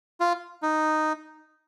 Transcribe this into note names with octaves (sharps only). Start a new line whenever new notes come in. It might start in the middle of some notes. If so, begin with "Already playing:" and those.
F4
D#4